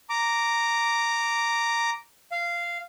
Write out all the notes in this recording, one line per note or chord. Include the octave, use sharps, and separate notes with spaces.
A#5 D6
F5